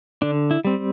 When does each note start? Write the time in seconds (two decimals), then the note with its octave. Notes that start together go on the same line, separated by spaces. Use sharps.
0.22 D3 D4
0.51 E4
0.65 G3 C4